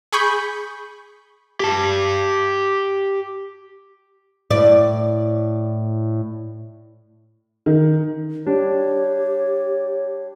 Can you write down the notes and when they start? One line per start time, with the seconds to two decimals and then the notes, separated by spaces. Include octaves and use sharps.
0.12 G#4 B5 C#6 G6
1.60 G4 A5
4.51 A2 D5
7.66 D#3
8.46 G3 D4 G4 C#5